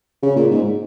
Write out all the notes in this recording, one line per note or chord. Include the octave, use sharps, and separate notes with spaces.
C#3
A#2
G#2